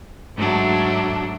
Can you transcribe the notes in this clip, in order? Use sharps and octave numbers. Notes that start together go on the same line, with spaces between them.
G#2 F#3 A3 D4